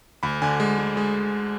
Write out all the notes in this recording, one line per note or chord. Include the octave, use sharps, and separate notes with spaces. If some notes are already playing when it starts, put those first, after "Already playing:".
D2 B5
D3 G#5
G#3
G#3
G#3